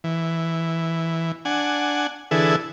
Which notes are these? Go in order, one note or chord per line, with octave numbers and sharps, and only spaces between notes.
E3
D4 F#5 G#5
D3 E3 E4 G#4 A4 B4